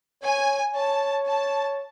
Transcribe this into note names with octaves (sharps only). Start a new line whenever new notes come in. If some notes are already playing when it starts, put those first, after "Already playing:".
C#5 G#5
C#5 A5
A5